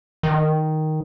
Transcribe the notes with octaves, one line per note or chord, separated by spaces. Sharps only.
D#3